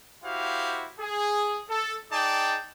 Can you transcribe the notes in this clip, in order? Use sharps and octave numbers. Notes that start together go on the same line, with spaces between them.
E4 F#4 G4 C5 F5
G#4
A4
D#4 G#4 D5 G5 A5